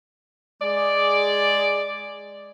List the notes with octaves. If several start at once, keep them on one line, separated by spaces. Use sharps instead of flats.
G#3 G#4 D5